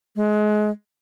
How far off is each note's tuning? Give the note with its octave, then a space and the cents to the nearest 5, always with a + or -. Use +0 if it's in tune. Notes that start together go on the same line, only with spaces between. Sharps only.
G#3 +25